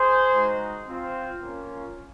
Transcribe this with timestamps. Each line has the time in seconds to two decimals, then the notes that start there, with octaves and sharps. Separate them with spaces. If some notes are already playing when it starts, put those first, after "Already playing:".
Already playing: G#4 C5
0.32 G#3 D#4 F#4
0.87 C4 F4
1.41 A#3 C#4 F4